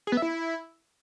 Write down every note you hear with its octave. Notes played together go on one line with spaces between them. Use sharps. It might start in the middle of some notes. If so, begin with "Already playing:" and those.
G#4
B3
E5
E4